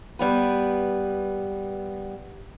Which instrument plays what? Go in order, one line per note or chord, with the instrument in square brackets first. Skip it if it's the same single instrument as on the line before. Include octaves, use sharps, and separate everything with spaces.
[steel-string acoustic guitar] G3 B3 B4